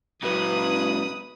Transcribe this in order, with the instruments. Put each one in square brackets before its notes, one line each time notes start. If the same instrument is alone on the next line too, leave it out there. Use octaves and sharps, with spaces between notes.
[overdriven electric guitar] C#2 F#3 [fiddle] B4 [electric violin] D#6